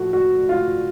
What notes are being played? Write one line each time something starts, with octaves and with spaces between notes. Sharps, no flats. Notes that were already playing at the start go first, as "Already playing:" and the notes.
Already playing: A2 F3 A3 F#4
F#4
F4